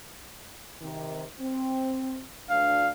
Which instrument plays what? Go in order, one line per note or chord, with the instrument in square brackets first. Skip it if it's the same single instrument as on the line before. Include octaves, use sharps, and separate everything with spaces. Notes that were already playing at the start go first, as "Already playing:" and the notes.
[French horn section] C3 D#3
C4
[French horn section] D2 D4 [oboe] F5